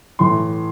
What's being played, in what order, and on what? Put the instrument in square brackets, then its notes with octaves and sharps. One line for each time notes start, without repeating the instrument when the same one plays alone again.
[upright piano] A2 E3 C6